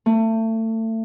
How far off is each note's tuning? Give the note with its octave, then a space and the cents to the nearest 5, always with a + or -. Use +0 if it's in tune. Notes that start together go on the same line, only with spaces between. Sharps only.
A3 +30